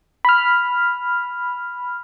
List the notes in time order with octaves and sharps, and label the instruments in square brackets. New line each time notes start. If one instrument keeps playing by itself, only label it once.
[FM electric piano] B5 F6